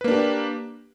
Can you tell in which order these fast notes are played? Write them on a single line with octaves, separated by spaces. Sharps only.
B4 A#3 D4 G4